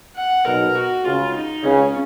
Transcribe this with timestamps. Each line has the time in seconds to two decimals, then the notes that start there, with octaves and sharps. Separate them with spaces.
0.16 F#5
0.45 B1 B2 A#4
0.75 F#4
1.04 C#2 C#3 F4
1.34 D#4
1.63 C#2 C#3 C#4